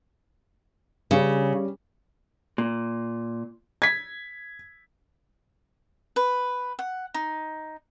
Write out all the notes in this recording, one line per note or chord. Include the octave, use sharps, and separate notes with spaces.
C#3 G3 C#4
A#2
G#6 B6
B4
F#5
D#4